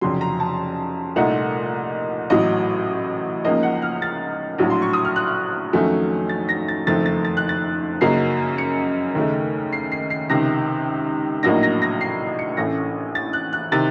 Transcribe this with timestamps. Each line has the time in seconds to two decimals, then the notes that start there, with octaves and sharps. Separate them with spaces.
0.01 F1 F2 C#3 F#3 C6
0.21 A#5
0.40 A5
1.16 C2 A#2 A3 D#4 F#5
2.30 A1 A2 F#3 D#5
3.45 C#2 C#3 F3 A#3 D#4 D#5
3.63 F#5
3.82 F6
4.02 A6
4.58 A#1 A2 F#3
4.70 C6
4.82 C#6
4.93 D#6
5.05 F6
5.16 F#6
5.73 F2 D#3 F#3 A3 C#4
6.29 A6
6.49 A#6
6.68 A6
6.87 F#1 F2 D#3 A3 C4 A6
7.06 A6
7.25 A6
7.37 F#6
7.49 A6
8.01 F#2 C#3 F#3 A#3 D#4 C7
8.58 C#7
9.15 D#2 C#3 A3 D#4
9.73 C7
9.92 C7
10.10 C7
10.29 C#2 C3 D#3 A#6
11.43 A#1 A2 F#3 A#3 D#4 A#6
11.63 A#6
11.82 A#6
12.01 C7
12.39 C#7
12.57 A1 A2 A3 C#4 A#6
13.15 A6
13.33 F#6
13.53 F#6
13.72 C3 D#3 A6